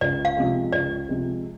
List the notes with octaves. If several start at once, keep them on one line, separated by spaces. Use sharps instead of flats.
C#2 D5
F5
C3 F3 G#3
C#2 D5
C3 F3 G#3